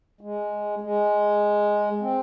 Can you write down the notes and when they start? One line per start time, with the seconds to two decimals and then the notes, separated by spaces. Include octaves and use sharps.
0.21 G#3
0.81 G#3
2.01 C4